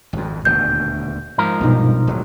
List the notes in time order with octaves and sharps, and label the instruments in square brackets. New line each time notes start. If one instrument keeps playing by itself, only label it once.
[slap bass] G#1 F2
[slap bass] D#1 D2 B2 [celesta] G6
[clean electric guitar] G#2 F3 A#4
[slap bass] B1 G2 [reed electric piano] B2 D#4
[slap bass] D1 F#3